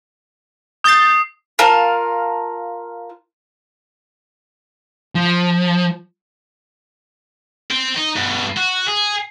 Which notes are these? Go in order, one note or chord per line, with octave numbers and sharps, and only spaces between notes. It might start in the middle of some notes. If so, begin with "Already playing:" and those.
D#6 G6 A6 C7
F4 A#4 F5 A5
F3
C5 G5
D#4
G2 B2
F#4
G#4